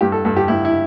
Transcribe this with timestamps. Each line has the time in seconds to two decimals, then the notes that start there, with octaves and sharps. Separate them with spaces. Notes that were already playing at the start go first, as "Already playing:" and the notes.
0.01 G2 G4
0.12 A4
0.25 G2 A4
0.37 G4
0.48 G2 E4
0.65 E4